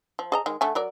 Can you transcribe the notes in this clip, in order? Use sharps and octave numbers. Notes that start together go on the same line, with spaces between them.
F3
G#4 D#5 A#5
D#3 G#3
D3 A3 G#5
F#3 A#4 D5